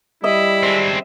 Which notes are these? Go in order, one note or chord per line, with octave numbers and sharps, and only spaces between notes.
G3 E4 D#5 E5
G#3 C4